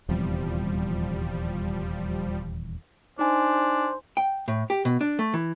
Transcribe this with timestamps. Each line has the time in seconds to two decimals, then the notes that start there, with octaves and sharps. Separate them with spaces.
0.09 D#1 E2 C3 F3 G3
3.19 D4 D#4 C5 G#5
4.17 G5
4.48 A2
4.70 G4
4.85 B2
5.01 D4
5.19 A3
5.34 E3